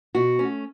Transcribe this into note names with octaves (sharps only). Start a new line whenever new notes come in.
B2 F#4
A3 C#4